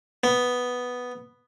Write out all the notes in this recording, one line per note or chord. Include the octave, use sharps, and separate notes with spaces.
B3